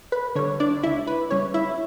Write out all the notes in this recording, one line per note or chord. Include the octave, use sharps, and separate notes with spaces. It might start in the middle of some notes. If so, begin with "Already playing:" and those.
B4
D3 G3 C#5
D4 D5
C#2 E4 E5
B4
C#3 G3 C#5
E4 E5